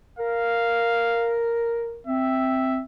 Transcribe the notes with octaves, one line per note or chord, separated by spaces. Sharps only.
A#4 F5
C4 E5